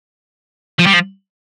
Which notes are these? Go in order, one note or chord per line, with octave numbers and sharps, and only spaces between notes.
F3
G3
F3